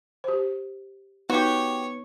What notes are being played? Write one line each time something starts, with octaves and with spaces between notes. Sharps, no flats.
G4 C5
B3 D#4 F#4 G4 C#5